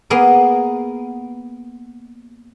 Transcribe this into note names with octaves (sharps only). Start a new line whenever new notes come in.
A#3 B3 G#4 A#4